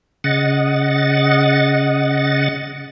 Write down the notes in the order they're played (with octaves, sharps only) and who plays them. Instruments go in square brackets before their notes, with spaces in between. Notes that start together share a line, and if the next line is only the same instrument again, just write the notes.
[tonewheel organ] C#3 D#5 F#5 A6